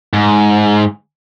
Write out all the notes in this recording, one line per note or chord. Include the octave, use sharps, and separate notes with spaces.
G#2